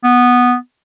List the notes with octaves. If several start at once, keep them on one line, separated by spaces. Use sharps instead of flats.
B3